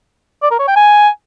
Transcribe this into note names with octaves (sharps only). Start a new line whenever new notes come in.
D5
A#4
C#5
G5
G#5